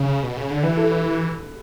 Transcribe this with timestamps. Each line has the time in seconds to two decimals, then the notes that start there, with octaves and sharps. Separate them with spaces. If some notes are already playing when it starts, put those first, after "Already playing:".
Already playing: C#3
0.23 B2
0.37 C#3
0.50 D3
0.63 E3 B4
0.77 A4
0.91 B4